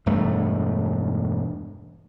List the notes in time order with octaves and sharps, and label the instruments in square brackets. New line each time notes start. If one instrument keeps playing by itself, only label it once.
[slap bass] E1 G2 A3